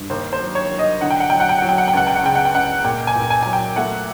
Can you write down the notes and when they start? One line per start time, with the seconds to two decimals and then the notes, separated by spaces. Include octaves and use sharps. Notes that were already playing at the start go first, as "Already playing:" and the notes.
Already playing: G2
0.10 D#2 C5
0.33 C5
0.41 F#3
0.55 C#5
0.70 F#3
0.79 D#5
1.01 D3 F#5
1.11 G5
1.20 F#5
1.30 F#3 G5
1.40 F#5
1.49 G5
1.59 F#3 F#5
1.69 G5
1.78 F#5
1.88 G5
1.93 C#2 F#5
2.07 G5
2.16 F#5
2.23 C#3 G5
2.35 F#5
2.45 G5
2.54 C#2 F#5
2.84 A#2 G5
3.07 G#5
3.15 A#2
3.30 G#5
3.43 F#3 G#5
3.53 G5
3.76 A3 F#5